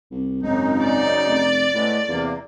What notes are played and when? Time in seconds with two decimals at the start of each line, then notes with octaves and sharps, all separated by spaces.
0.11 C2
0.43 G#1 F#2 C#3 D#4
0.85 D5
1.26 F1
1.74 A2 G#3 A3 B3
2.09 E2 C3 A#3